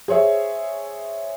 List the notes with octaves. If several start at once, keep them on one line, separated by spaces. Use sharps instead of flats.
G#4 C5 C#5 E5